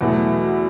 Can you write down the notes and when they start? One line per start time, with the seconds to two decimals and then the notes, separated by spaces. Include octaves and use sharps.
0.01 E2 B2 F#3 A3